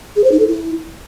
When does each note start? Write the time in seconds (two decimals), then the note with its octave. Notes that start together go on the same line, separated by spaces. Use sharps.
0.16 G#4
0.24 C5
0.32 D#4
0.40 A4
0.47 E4